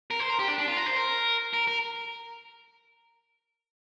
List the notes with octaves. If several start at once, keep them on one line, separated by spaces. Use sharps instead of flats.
A#4
C5
A#4
G4
D4
D4
F4
A#4
C5
A#4
A#4
A#4